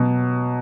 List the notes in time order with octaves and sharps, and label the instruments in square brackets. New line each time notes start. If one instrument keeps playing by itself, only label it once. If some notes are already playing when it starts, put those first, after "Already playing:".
Already playing: [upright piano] B2 F#3